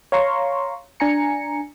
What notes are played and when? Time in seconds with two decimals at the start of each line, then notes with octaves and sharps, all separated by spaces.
0.12 C#5 F5 A#5 C6 C#6
1.00 D4 G#5 A#5 C#7